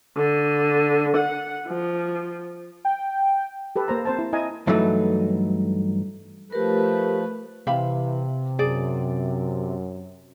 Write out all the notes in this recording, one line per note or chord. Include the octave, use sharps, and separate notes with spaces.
D3
F#5
F3
G5
G4 A4 B4
A#3 C5 A#5
C4 C5 A5
E4
E4 D#5 G#5 A#5
G2 E3 F#3 A3 D#4
F3 A3 G4 A#4 B4
C3 E3 E5 F5 B5
F#2 G#4 D5